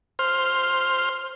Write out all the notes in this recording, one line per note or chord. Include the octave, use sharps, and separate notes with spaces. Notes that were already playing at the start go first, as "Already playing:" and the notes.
C5 F6